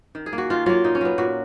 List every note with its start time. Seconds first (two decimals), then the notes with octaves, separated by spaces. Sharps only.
0.15 D#3
0.26 G#4
0.33 A#3
0.38 F#4
0.50 D#3 F4
0.66 F#3 A#3 F4
0.84 A#2 D#4
0.95 C#4
1.01 F#3 B3
1.18 A#2 F#4